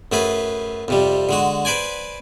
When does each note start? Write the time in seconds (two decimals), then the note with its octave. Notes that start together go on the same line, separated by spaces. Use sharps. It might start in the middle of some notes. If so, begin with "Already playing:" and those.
0.12 F#2 A3 G#4 B4
0.88 F2 C3 G3
1.29 D3 G#3 F#4
1.65 B4 C5 D5 G#5